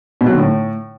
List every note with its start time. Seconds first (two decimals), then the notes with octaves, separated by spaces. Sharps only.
0.21 B2
0.27 F#3
0.33 D3
0.39 A2